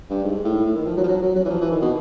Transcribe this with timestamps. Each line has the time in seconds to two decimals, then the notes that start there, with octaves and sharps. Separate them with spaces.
0.10 G2
0.24 G#2
0.45 A2
0.66 A2
0.76 D#3
0.86 F3
0.97 F#3
1.04 F3
1.08 F#3
1.22 F#3
1.36 F#3
1.45 E3
1.50 F3
1.61 E3
1.71 D#3
1.82 B2